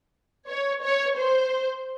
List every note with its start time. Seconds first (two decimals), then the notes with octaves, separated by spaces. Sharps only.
0.48 C#5
0.82 C#5
1.17 C5